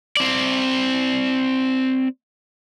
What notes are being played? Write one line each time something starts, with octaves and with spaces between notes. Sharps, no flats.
C4 D5